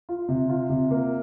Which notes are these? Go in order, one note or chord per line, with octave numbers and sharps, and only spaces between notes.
F4
C3
F4
C3
A#3